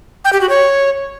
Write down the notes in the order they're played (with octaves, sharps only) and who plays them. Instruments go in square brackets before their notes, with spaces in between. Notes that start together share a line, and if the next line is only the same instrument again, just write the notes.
[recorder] G5
G4
F#4
C#5